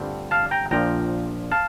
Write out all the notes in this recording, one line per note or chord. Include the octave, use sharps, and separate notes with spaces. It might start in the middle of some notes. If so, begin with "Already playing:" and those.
Already playing: G2 D3 A3 C4 F4
F5 A5
G5 A#5
A#1 A#2 F3 G5 A#5
F5 A5